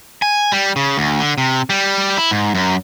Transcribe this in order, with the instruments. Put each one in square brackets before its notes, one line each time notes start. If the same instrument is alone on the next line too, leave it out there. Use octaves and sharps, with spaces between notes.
[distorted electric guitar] G#5
G3
C#3
D2
D3
C3
G3
E4
G#2
F#2